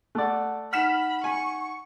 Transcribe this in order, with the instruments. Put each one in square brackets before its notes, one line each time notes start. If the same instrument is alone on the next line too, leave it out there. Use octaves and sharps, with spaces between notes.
[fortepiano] A3 D5 [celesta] F#5 F#6
[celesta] D#4 F#5 [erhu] B5 [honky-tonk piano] F6 B6 E7
[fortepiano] G#5 [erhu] C#6